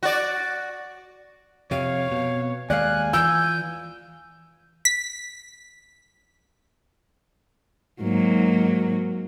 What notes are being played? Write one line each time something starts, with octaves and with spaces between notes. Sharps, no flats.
F#4 D5
F2 C3 C#5 F5
B2
D#2 G#3 D5 F5 G#5 F#6
E3 F4 E6 G6
B6
G#2 F#3 A#3